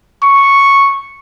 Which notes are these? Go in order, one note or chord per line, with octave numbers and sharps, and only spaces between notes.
C#6